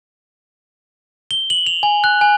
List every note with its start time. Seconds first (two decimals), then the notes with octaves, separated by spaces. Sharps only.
1.31 G7
1.50 F#7
1.66 F7
1.83 G#5
2.04 F#6
2.21 G#5